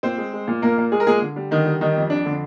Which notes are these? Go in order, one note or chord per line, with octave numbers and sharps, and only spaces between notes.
A#2 C4 C5
G#3
G#3
A#2
A#2 A#3 A#4
A#2
G#3 G#4
A#4
A#2 G#3 G#4
D3
G3
D3 D#3 D#4
G3
D#3 G3 D#4
F2
F2 D4
D3